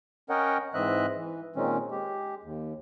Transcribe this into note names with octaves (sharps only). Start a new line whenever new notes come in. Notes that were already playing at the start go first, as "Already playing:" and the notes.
C#4 A#4 C#5 D#5 F#5 G5
G#2 E3 C4 D#5 E5 F#6
E3
A#2 D#3 G#3 C4 C#4
G#3 G4
D#2